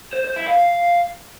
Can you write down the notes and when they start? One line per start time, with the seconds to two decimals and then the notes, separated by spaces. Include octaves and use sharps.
0.13 C5
0.24 C5
0.36 E4
0.48 F5